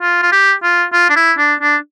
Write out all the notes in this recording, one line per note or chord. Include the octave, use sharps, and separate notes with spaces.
F4
F4
G4
F4
F4
D4
E4
D4
D4